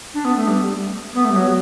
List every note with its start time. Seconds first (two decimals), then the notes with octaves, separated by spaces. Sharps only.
0.14 D4
0.24 B3
0.36 A3
0.47 G3
1.14 B3
1.24 A3
1.31 G3
1.36 F#3